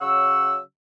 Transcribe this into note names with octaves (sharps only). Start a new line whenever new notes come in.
C#3 F#3 F#5 C#6 E6